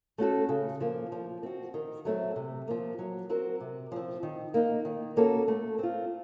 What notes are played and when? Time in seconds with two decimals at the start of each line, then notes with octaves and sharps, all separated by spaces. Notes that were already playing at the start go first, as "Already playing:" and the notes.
0.18 A3 C#4 F#4 A4
0.49 C#3
0.81 F3 A#3
1.12 F3
1.43 C4 F#4
1.74 D#3
2.05 F#3 A3 C4
2.36 C3
2.68 F3 A#3
2.99 F#3
3.30 C4 F#4 A#4
3.60 C3
3.92 F3 C4
4.23 D#3
4.54 A#3 D#4
4.85 D#3
5.17 A#3 C#4 F#4 A4
5.48 A3
5.79 C4 F4